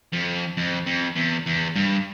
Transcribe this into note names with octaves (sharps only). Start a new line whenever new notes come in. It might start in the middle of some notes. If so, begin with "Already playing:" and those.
F2
F2
F2
E2
E2
G2